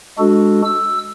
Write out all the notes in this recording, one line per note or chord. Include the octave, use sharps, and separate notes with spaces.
G#3 D4 F#4 A4
E6